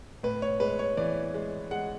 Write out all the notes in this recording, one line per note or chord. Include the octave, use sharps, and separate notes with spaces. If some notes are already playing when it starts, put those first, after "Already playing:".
A2 B4
C#5
G#3 B4
C#5
E3 D5
G#3
G#3 F#5